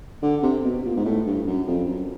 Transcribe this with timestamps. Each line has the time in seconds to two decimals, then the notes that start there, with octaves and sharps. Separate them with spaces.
0.22 D3
0.43 C3
0.64 B2
0.85 A#2
0.96 G#2
1.05 A2
1.26 G2
1.47 F#2
1.67 F2
1.88 F#2